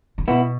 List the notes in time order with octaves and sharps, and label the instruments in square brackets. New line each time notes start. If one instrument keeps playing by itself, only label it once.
[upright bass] D3
[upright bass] B2 [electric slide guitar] B3 E4